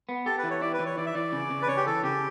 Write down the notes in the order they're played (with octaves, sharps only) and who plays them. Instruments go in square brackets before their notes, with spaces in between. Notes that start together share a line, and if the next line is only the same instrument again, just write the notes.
[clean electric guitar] B3
[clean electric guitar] G4 [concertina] A4
[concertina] B4
[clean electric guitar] E3
[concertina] C#5
[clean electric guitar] E4 [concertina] D5
[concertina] B4
[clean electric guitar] E3
[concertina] C#5
[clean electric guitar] E3 [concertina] D5
[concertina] E5
[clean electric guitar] E3 [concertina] D5
[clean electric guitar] C#3
C#3
[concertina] B4
[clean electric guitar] C#3 [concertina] C#5
[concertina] G4
[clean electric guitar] E3 [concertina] A4
[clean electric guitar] C#3 [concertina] G4